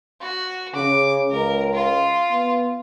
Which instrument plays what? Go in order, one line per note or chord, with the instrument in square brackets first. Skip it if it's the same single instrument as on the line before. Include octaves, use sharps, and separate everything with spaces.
[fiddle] F#4
[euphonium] C#3 [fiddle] D6
[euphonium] C#2 [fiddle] A#4
[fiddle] F4
[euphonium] B3